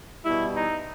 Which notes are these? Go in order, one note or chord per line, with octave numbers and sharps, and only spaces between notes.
B2 G3 E4
D#4